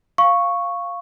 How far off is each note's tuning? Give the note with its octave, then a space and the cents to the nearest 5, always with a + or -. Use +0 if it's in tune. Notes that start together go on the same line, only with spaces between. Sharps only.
F5 +0 C#6 -5